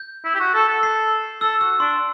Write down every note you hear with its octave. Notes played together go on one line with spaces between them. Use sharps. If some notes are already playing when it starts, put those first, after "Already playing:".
Already playing: G6
E4
G4
F#4
A4
A4
C7
A4 E6
F#4 E6
D4 C6